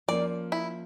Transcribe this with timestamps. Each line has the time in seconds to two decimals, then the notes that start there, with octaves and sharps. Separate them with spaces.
0.08 F3 A#3 C#4 D5
0.52 E4